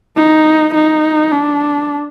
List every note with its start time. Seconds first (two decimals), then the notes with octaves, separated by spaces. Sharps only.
0.16 D#4
0.75 D#4
1.32 D4